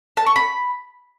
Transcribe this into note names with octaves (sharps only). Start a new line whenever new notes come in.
A5
C#6
B5